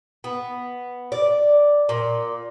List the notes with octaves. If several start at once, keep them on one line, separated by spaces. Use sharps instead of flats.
B3
D5
A#2